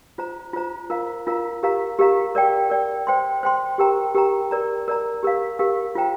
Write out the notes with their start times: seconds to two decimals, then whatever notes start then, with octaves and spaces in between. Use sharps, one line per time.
0.18 F4 C5 A#5
0.53 F4 C5 A#5
0.90 F4 A#4 F5 A#5
1.27 F4 A#4 F5 A#5
1.63 G4 A#4 F5 A#5
1.99 G4 A#4 F5 A#5
2.35 A#4 D5 G5
2.70 A#4 D5 G5
3.07 C5 G5 C6
3.43 C5 G5 C6
3.78 G4 A#4 G5 A#5
4.14 G4 A#4 G5 A#5
4.51 A#4 D5 A#5
4.88 A#4 D5 A#5
5.23 G4 A#4 F5
5.59 G4 A#4 F5
5.95 F4 C5 G5 A#5